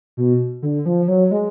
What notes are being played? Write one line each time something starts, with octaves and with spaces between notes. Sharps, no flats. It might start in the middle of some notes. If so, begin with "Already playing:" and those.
B2
D3
F3
F#3
G#3